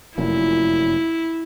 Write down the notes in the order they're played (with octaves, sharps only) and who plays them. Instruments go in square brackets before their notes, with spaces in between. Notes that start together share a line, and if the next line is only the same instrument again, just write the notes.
[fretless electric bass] F1 F#2 A#2 [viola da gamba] E4